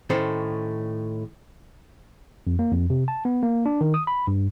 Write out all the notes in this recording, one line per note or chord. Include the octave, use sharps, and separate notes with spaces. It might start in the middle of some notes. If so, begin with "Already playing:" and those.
A2 D#3 A3 C#4 A4 C5
F2
A#3
F2
C3
A5
B3
A#3
D4
D#3
D#6
B5
G2